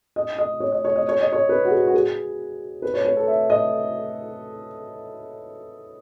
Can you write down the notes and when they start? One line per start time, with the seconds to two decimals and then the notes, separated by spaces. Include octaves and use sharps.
0.16 D#5
0.38 D#5
0.60 C#5
0.72 D#5
0.85 C#5
0.96 D#5
1.09 C#5
1.21 D#5
1.32 C#5
1.49 B4
1.65 F#4
1.71 G#4
1.87 F#4
1.94 G#4
2.82 B4
2.94 C#5
3.05 C#5
3.17 A4
3.27 E5
3.50 D#5